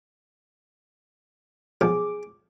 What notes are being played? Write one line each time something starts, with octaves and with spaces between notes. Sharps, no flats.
B1 F3 G#4 D6